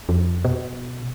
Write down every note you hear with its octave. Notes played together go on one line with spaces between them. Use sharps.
F2
B2